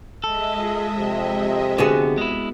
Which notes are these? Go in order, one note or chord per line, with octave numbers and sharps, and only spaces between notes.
G#3 A4 D#5 E5
F4 G#4
F2 C3
D3 B3 F#4 G#4
G#3 E4